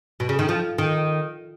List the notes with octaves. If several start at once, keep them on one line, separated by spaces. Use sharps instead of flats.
B2
C#3
D#3
F3
D#3